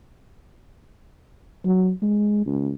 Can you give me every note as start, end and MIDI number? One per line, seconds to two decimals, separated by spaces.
1.65 1.91 54
2.02 2.42 56
2.46 2.72 37